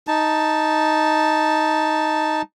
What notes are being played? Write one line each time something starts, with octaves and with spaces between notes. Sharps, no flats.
D#4 A5